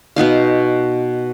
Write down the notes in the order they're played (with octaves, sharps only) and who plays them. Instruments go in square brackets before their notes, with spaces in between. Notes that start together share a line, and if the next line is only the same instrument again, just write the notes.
[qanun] B2 B3 D#4 F5